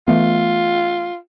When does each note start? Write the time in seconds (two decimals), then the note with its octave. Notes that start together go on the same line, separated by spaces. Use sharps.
0.08 E3 A3 B3 F4